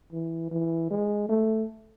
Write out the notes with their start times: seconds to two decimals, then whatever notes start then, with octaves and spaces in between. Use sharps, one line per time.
0.13 E3
0.51 E3
0.91 G#3
1.29 A3